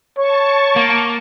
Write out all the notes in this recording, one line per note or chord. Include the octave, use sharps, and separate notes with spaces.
C#5 A5 C#6
A#3